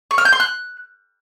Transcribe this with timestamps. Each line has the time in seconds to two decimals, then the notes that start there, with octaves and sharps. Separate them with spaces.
0.11 C#6
0.18 F6
0.25 G6
0.33 C6
0.40 F#6